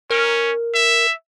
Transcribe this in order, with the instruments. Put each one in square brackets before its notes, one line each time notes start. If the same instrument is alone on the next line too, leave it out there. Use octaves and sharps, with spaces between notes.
[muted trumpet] C#4 [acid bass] A#4
[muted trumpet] E5